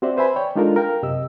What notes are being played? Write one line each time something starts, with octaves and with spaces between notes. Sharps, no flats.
C4 F#4 G4 C5 D5 E5
B4 C5 E5 G#5 B5
C#5 D5 G5
G#3 D4 D#4 F4 A4 A#4
A#4 F5 G5
F#2 C3 G4 D#5 E6